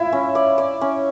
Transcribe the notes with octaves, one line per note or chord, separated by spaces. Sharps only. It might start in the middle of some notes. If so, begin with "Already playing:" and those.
Already playing: E4 F4
C#4
D5
D5
C#4